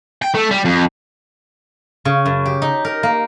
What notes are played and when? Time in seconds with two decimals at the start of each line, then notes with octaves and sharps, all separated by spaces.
0.22 G5
0.35 A3
0.51 G3
0.65 F2
2.05 C#3
2.26 F#2
2.46 G4
2.62 D#4
2.85 A#4
3.03 A#3